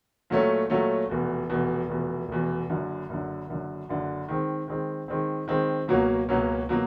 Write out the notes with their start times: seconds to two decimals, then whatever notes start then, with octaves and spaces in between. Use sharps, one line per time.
0.30 A#2 F#3 A3 C#4
0.70 A#2 F#3 A3 C#4
1.09 F1 E2 B2
1.50 F1 E2 B2
1.89 F1 E2 B2
2.29 F1 E2 B2
2.69 F#1 F#2 D3
3.09 F#1 F#2 D3
3.48 F#1 F#2 D3
3.89 F#1 F#2 D3
4.29 D#3 G#3 C4
4.68 D#3 G#3 C4
5.08 D#3 G#3 C4
5.48 D#3 G#3 C4
5.88 C#2 B2 F#3 A#3 C#4
6.29 C#2 B2 F#3 A#3 C#4
6.69 B2 F#3 A#3